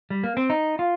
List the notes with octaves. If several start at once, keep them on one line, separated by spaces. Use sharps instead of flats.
G3
A#3
C4
D#4
F4